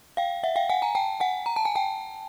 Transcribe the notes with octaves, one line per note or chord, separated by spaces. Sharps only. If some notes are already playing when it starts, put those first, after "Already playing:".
F5 G5
E5 F#5
F5 G5
F#5 G#5
G#5 A#5
G5 A5
F#5 G#5
A#5
A5
G#5
G5 A5